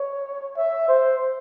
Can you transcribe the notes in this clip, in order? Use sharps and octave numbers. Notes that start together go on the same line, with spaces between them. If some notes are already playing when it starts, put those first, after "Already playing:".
Already playing: C#5
E5
C5